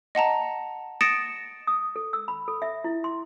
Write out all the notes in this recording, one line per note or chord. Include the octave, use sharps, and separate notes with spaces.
D#5 F#5 A5 A#5
D#6 A6 A#6 C#7 D7 E7
D#6
A4
E6
B5
A4
E5
E4
C6